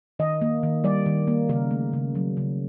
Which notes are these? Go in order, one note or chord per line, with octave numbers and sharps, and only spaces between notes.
D#3 D#5
A#3
D#3
G3 D5
D#3
A#3
C#3 A#4
A3
C#3
F#3
C#3